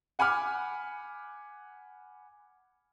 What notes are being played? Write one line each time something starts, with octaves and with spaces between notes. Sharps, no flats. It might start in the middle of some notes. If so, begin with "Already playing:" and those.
F#5 G#5 B5 D6 F6